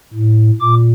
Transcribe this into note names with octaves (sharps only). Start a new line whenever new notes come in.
A2
A#2 D6